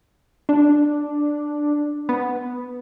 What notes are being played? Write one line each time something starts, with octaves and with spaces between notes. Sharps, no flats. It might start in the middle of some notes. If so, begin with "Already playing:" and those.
D4
B3